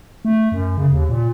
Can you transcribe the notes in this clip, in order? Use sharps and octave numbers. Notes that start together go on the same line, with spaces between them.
A3
F#2
C#3
D#2
A#2